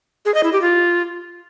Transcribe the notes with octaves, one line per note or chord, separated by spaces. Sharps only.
G#4
D#5
E4
G4
F4